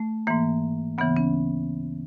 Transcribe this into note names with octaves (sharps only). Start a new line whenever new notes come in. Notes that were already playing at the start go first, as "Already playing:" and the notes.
Already playing: A3
G#2 E3 A#3
D2 C#3 E3 B3
C#4